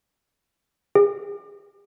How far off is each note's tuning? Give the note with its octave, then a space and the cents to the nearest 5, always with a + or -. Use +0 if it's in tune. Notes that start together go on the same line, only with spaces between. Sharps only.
G#4 -40